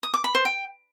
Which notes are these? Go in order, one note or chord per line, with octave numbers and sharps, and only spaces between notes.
D#6
D6
B5
C5
G5